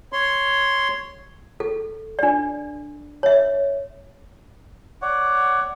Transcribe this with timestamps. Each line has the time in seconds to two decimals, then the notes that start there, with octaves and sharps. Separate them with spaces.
0.13 C#5 C6
1.60 A4
2.19 D4 D5
3.23 C#5 E5
5.02 C#5 D5 F#5